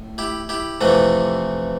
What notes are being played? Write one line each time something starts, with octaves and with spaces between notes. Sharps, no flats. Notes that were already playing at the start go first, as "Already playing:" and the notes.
Already playing: A2
E4 G4
E4 G4
F2 C3 E3 A3 C4